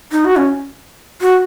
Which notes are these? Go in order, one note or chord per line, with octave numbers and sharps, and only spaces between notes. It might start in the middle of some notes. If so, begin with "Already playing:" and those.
D#4
F#4
C#4
F#4